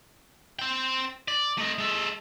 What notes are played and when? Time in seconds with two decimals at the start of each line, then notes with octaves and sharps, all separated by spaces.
0.59 C5 G5
1.28 D5
1.58 A3 D#5
1.78 G#3 A4